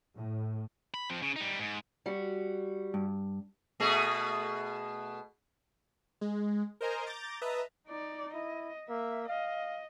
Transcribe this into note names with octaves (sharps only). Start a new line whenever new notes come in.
A2
B5
F3 C4
C#3
G3 D#4
G#2
G3 F#4
G2
B2 A3 G#4
G#3
A#4 C5 D#5 G#5 A#5
A#5 D6 G6 A6
B4 D#5 E5 A5 A#5
D#4 D5
E4 D#5
A#3 E5
D#5 F5